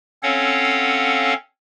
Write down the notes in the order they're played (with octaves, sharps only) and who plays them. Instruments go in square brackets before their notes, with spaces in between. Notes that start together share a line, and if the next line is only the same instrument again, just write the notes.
[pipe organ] C4 C#4 A4 C#5 F5 F#5